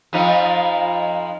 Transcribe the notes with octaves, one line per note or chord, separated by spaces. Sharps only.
F2 F3 D#4